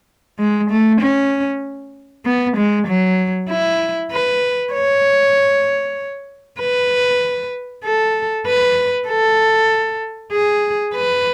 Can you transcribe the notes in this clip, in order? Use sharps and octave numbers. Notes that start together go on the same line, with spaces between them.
G#3
A3
C#4
B3
G#3
F#3
E4
B4
C#5
B4
A4
B4
A4
G#4
B4